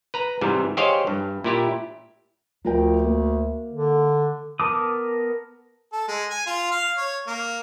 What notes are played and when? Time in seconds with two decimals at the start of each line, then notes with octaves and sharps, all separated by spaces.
0.14 B4 A#5
0.41 G#2 C3 E3 G3
0.77 G4 G#4 C5 C#5 D#5 F5
1.07 G2
1.44 A#2 E4 G4
2.65 D2 F3 A#4 G5
3.04 A#3
3.72 D3
4.60 B3 A#4 A5 D6 D#6
5.93 A4
6.08 G#3
6.30 G#5
6.46 F4
6.71 F5
6.98 C#5
7.28 A#3